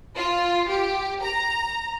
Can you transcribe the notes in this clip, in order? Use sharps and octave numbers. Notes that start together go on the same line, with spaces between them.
F4
G4
A#5